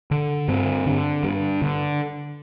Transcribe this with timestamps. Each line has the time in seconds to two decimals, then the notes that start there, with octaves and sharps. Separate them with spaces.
0.11 D3
0.48 G2 C4
0.86 D3
1.24 G2
1.62 D3